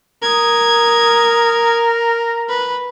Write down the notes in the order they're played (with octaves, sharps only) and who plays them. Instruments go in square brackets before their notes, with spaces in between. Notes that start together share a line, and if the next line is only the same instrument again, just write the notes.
[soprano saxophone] A#4 [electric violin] D#6 G#6
[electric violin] B4